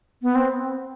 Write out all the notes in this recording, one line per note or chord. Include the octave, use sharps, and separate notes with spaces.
B3
C4